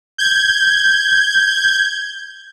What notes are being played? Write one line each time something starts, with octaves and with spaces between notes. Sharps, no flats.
G6 G#6